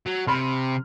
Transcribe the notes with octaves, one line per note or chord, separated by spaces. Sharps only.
F#3
C3 B5 C6 F6